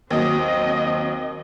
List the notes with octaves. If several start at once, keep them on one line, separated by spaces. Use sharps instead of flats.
D#2 F#3 C4 D#5